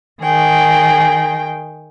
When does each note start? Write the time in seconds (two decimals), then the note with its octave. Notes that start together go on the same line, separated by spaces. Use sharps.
0.21 D#3 G#4 G5